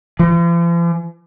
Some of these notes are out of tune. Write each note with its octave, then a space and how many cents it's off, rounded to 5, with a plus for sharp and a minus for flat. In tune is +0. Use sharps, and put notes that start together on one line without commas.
F3 -45